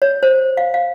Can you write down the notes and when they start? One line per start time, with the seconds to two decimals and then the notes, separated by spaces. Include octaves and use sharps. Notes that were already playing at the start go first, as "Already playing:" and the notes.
0.02 C#5
0.23 C5
0.57 F5
0.74 F5